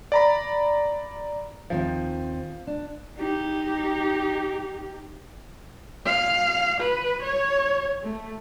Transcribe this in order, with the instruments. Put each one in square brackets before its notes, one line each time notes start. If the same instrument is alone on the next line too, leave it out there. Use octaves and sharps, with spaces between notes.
[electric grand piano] D5 A#5 B5
[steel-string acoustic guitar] D#2 D#3 C4 [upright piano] F3
[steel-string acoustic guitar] D4
[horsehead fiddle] D#4 G4
F5
B4
C#5
A3